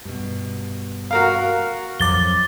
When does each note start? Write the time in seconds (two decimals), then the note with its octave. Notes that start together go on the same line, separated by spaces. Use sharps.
0.05 G2 B2
1.11 F#4 A#4 F5
2.00 F2 F3 F#3 D6 A6 G7